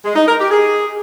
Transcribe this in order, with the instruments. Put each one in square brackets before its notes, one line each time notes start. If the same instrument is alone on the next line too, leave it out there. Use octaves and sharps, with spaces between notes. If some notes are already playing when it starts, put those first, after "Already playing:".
[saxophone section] G#3
D#4
A#4
G4
G#4